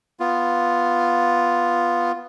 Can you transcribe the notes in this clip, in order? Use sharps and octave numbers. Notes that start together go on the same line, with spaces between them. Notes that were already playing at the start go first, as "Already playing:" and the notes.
B3 F4